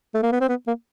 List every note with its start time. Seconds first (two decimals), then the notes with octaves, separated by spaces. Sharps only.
0.14 A3
0.23 A#3
0.32 B3
0.41 C4
0.49 B3
0.67 A#3